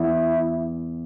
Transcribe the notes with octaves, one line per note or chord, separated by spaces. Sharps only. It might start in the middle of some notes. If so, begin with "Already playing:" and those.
Already playing: E2 E4